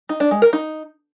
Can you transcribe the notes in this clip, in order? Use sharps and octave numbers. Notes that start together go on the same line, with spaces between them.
D#4
D4
G#3
A#4
D#4